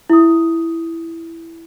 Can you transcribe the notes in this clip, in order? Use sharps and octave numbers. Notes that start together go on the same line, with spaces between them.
E4 D#6